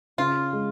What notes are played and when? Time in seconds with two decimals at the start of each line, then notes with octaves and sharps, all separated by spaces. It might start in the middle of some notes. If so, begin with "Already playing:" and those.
0.18 C#3 F4
0.53 G#3